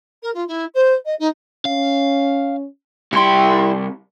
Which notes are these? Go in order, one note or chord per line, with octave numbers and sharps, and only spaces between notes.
A#4
F4
E4
C5
D#5
D#4
C#4 F5
C2 G3 E4 G4 G#5 C6